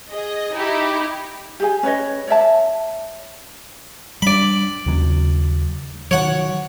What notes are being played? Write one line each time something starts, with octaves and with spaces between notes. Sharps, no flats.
G#4 D#5
D#4 E4 G4
G4 G#4 G#5
C#4 B4 C#5 D#5
C#5 D5 E5 A5
G3 D4 D5 B5
D#2 C#3 F#3
D#3 F#3 C#5 F#5